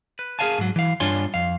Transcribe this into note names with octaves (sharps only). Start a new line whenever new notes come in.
B4
G#4 A#4 D5 F5 G#5 A5
G#2 F#3
E3 F5
G2 D4 F4 C#5 G#5 C6
F2 F5